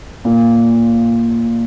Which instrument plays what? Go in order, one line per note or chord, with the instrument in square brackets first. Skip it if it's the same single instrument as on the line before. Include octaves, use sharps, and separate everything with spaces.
[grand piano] A#2